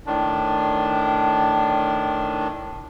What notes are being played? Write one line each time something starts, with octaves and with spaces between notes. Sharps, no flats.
A2 D#3 D4